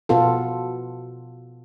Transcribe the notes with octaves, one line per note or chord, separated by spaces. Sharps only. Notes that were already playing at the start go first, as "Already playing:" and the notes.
B2 B3 F4 A4